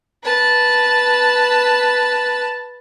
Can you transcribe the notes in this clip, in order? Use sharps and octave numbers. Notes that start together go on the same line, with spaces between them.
B4 A5